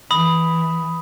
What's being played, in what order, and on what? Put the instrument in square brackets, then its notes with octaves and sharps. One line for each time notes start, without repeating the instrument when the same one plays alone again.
[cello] E3 [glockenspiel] B5 D#6